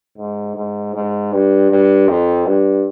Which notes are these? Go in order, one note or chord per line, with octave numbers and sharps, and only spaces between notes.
G#2
G#2
G#2
G2
G2
F2
G2